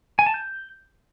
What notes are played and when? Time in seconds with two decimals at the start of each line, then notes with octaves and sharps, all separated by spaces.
0.19 G#5
0.26 A5
0.34 G6